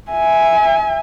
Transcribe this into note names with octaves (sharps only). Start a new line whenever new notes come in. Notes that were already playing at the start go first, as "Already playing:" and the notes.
E5 G#5